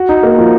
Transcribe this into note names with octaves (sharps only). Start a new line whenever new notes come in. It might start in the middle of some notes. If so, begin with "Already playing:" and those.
Already playing: F#4
D#4
A#3
F3